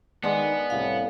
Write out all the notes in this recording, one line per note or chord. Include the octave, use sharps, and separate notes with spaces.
D#3 G#3 B3 D4
C2 A2 F5